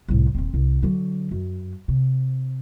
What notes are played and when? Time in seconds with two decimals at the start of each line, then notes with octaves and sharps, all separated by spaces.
0.08 C2 A2
0.35 D#1 C4
0.54 C2
0.83 D3 F#3
1.31 F#2
1.88 C3